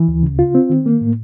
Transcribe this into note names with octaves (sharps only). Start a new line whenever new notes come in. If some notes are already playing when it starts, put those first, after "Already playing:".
Already playing: E3
D2
C#3
F4
C4
D#3
A#3
A2